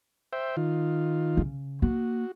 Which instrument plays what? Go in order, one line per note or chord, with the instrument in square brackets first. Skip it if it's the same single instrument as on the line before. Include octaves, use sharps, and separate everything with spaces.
[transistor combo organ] C5 E5 G5
D#3 F4
[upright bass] C#3
[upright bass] A#3 [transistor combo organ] F#4